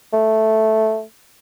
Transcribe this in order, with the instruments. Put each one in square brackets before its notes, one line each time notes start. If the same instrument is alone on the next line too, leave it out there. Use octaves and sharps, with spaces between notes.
[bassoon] A3